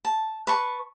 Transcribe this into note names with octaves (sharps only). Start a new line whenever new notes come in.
A5
B4 A5 C#6